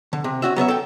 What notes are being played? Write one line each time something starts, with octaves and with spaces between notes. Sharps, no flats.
D3
C3
C#4 F#4 E5
F#3 B3 C#5 E5
A4 G5